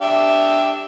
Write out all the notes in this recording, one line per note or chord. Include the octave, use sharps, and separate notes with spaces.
D4 G4 E5